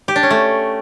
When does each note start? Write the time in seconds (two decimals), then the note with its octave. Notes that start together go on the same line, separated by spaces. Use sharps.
0.08 G4
0.16 D4
0.23 C#4
0.30 A3